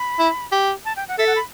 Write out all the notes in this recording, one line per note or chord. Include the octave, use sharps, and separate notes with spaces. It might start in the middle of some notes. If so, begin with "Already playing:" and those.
Already playing: B5
E4
G4
A5
G5
F#5
A4 E5
F#5
B5